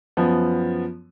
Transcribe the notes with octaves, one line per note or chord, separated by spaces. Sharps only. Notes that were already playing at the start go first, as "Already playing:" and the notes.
F#2 F3 B3